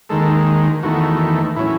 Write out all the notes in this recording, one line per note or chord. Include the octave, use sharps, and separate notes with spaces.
D#2 D#3 G#3 A4
E2 D#3 A3 F#4
A2 F#3 C#4 E4